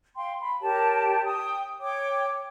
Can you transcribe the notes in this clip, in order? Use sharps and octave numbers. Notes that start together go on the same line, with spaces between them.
F5 G5 C6
B5
G4 A#4 C#5 A5
G5 D#6
C#5 G5 D6